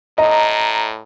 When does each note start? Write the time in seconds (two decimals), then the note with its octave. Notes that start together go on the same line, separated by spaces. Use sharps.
0.18 A2 D#5 A#5